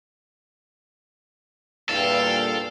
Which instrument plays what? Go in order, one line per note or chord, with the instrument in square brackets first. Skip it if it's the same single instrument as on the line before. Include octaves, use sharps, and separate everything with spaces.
[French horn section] E2 G2 A#2 [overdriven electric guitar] A4 [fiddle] F5 G5